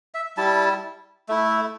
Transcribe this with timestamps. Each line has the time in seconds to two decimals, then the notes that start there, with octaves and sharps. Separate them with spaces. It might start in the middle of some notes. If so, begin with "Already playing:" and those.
0.14 E5
0.37 G3 E4 A5
1.29 A3 E4